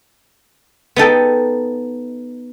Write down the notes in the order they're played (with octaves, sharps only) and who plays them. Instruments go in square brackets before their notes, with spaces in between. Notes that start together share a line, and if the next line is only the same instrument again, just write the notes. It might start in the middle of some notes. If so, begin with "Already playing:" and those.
[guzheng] B3 D#4 A4 G5